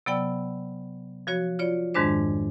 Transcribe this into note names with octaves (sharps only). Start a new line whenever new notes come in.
C3 F#3 B3 D5 G5 E6
F3 F#4 C#5
F4 C#5 D5
F2 G#2 D#3 G#3 D4 C5